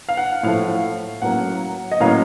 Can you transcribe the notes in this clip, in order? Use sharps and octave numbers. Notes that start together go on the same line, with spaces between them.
F5
F#5
A2 F3 A3 F5
A2 F#3 A#3 C#4 F#5
D#5
A2 F#3 A#3 C#4 F5